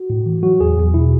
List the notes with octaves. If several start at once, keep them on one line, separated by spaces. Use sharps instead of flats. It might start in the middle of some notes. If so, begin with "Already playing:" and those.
Already playing: F#4
A2
E3
F#3 F#4
E2 G#4
E2
B2 E4